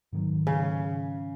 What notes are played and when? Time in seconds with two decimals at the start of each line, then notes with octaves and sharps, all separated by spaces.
0.13 G#2 D#3 F#3
0.47 C#3